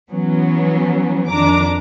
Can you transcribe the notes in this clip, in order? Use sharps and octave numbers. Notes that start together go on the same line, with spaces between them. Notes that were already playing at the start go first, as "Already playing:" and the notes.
E3 F#3 B3 C#4
F2 D#3 D4 A#5 D6